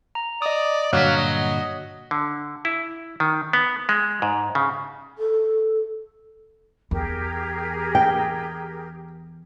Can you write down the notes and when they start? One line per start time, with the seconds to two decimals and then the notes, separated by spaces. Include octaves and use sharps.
0.15 A#5
0.42 D5 D#5 D#6
0.93 G2 A#2 D3 F#3 F5 F#6 B6
1.17 D#5
2.11 D3
2.65 E4
3.20 D#3
3.53 B3
3.89 G#3
4.22 G#2
4.55 C#3
5.18 A4
6.91 E2 G4 G#4 A#4
7.95 G5